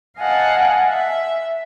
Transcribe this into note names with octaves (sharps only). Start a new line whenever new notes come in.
D#5 F5 F#5 G#5 A5
E5